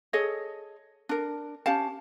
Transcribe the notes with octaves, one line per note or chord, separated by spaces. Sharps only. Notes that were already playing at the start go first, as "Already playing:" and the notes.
G#4 A4 C#5 D#5
D4 A#4
C#4 G4 F5 A5